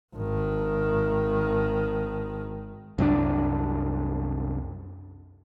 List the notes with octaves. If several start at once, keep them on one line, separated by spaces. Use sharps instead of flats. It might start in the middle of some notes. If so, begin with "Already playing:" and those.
G#1 D#3
C2 F#2 E3 D4